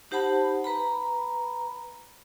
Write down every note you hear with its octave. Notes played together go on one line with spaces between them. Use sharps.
D#4 G4 C5 F#5 A5 B5
B4 A#5 B5